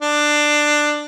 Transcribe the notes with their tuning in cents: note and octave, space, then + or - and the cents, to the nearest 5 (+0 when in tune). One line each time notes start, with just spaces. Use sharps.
D4 +15